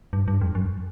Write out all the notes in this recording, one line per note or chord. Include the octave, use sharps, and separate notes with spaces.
G2
G2
F2
F#2